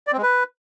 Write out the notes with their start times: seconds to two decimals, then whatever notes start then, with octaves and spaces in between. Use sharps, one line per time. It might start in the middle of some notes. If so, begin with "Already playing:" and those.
0.07 D5
0.12 C4
0.18 G#3
0.23 B4